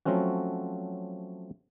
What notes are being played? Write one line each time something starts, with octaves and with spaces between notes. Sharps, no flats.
F3 F#3 A3 C4 C#4 F#4